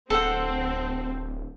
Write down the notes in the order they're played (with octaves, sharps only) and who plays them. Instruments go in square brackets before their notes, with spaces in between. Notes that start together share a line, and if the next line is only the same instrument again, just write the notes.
[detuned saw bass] D1 [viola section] C4 [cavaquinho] A4 F#5